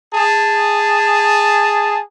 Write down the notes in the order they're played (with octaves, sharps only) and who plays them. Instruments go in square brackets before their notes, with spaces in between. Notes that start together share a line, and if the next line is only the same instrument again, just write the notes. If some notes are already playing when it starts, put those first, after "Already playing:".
[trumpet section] G#4 A5